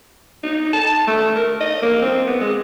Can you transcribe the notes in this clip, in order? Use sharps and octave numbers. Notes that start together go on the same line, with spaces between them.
D#4
A5
A3
A#4
D#5
A#3
C4
B3
G#3